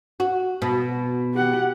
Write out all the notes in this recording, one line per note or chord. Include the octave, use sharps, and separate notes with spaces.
F#4
B2
G4 F#5